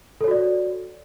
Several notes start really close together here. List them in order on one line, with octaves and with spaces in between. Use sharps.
A4 C#5 F#4 D5